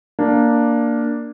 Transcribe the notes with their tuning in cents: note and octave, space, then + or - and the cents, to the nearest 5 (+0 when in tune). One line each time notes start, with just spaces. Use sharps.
A#3 +0 D4 +0